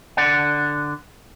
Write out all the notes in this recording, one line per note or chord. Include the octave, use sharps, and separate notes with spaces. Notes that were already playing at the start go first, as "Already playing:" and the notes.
D3 D5 F#5